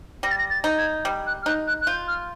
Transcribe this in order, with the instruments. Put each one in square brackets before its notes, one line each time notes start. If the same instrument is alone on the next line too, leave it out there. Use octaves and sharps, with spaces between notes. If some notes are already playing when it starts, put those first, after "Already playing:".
[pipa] G3 [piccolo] A#6
[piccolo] A6
A#6
A6
[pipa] D#4
[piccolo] G#6
[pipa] G3
[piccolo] F#6
F6
[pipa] D#4 [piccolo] F#6
[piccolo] F#6
F#6
[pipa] F4 [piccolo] G6
[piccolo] F6